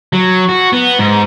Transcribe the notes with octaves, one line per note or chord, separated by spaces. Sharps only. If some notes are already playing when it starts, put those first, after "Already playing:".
F#3
F#4
B3
G#2